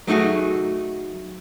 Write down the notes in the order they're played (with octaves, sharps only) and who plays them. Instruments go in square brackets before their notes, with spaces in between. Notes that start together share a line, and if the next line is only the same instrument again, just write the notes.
[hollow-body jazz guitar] F#3 A3 D#4 F#4 G#4